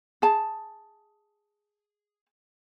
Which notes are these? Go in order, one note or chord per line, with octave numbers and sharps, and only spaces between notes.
G#4 A5